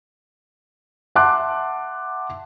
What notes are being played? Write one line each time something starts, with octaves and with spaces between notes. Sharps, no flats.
E5 F#5 A5 C6 D6 F#6